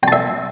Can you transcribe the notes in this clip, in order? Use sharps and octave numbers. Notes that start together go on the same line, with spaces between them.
E5 G5 A5